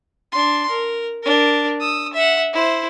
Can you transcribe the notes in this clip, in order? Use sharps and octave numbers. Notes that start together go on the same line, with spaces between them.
D4 C6
A#4
D4 A#4
D#6 E6
E5 F#5
E4 C5